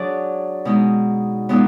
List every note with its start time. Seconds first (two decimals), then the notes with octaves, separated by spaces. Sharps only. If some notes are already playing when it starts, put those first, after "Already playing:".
Already playing: F#3 D4 G#4 D5
0.65 B2 G#3 D#4
1.49 A#2 G#3 B3 D#4